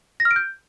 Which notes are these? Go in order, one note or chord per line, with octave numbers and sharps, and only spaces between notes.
A#6
F6
D7
G6